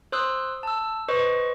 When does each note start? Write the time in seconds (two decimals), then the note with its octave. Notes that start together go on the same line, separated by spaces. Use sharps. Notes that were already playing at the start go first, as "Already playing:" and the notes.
0.12 C5 C6 D#6 E6 F#6
0.63 A5 E6
1.09 B4 C5 D#5 C#6